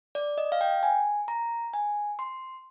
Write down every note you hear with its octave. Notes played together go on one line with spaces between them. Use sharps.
D5
D#5
F5
G5
G#5
A#5
G#5
C6